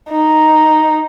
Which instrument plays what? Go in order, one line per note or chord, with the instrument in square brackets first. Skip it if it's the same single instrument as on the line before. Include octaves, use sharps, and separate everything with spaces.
[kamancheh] D#4